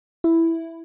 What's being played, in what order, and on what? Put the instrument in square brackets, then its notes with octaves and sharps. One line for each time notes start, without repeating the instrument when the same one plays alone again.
[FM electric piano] E4